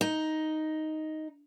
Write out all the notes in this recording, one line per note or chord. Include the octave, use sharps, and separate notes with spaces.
D#4